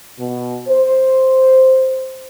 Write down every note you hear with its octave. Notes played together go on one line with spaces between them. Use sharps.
B2
C5